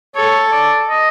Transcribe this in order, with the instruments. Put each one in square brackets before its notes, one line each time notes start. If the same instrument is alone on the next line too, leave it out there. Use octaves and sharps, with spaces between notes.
[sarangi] A4 [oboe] C#5
[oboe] D5
D#5